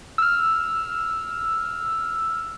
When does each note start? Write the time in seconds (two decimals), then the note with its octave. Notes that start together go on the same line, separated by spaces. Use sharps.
0.18 E6 F6